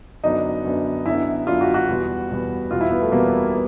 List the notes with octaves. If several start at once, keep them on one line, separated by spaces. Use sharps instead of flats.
F#2 D3 F#3 B3 D4 D#4
F#2 D3 F#3 B3 D4
F#2 D3 F#3 B3 D4 E4
F#2 D3 F#3 B3 D4 F4
F#4
F#4
E2 B2 G3 B3
E2 B2 G3 B3
E2 B2 G3 B3 F4
E4
B3
A3
E2 B2 G3 A#3 B3
B3